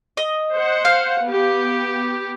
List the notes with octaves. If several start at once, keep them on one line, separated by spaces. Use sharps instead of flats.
D#5
C5 F#5
F5
B3 G4